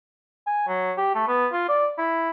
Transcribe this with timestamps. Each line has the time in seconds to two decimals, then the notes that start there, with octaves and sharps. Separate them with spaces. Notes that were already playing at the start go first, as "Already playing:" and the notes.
0.47 G#5
0.68 F#3
0.97 G4
1.15 A3
1.28 B3
1.52 F4
1.69 D5
1.98 E4